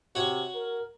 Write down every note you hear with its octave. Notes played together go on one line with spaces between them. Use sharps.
C3 F#4 C#5
A#4